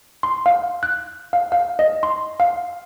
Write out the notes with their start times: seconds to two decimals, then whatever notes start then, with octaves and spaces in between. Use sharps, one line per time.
0.23 C6
0.46 F5
0.83 F#6
1.33 F5
1.52 F5
1.79 D#5
2.03 C6
2.40 F5